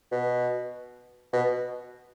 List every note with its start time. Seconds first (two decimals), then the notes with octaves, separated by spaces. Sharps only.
0.12 B2
1.33 B2